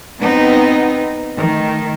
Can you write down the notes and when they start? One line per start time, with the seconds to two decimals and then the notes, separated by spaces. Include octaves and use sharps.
0.20 B3 C4 D#4
1.36 D#3 A3